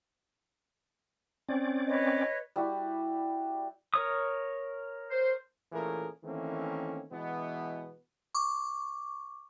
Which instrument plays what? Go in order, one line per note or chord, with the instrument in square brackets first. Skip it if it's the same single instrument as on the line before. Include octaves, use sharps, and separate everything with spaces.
[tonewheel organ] C4 C#4 D5
[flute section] B4 C#5 D#5
[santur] G3 E4 F#4
[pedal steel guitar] A#4 C#5 D#6
[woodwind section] C5
[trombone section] A#2 E3 A3 C#4 G#4 A#4
D#3 E3 A3 A#3 C4 C#4
B2 E3 G#3 B3
[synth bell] C#6 D6